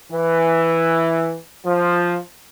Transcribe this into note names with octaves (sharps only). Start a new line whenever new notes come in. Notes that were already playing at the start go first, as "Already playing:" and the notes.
E3
F3